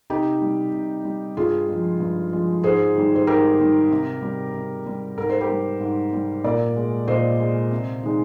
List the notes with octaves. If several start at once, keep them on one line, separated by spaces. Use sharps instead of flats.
C3 D#4 G4
G3
C3
G3
G2 F4 G#4
F3 G#3
G2
F3 G#3
G#2 G#4 C5
D#3 G3
C5
G#2 G4 A#4
D#3 G3
C3
G3
C3
G3
G#2 A#4
C5
G4 A#4
G3
G#2
G3
A#2 A#4 D5
G#3
A#2 C5 D#5
G#3
C3
D#3 G#3